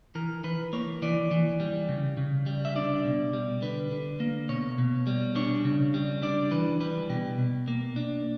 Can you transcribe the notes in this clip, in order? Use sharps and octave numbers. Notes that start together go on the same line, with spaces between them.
E3 A#4
E3 B4
A#3 C#5
E3 D5
E3
G3
C#3
C#3
G3
E5
D4 D5
B2
G3
D3 B4
D3
A#3
B2 C#5
B2
G3
D4 C#5
C#3
G3
D4 D5
E3 B4
G3 B4
B2 G4
B2
A#3
D4